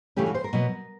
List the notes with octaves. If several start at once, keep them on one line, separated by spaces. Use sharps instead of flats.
C#3 E3 A3 C#4 G4
F#4
C5
A#4
B2 F#3 B3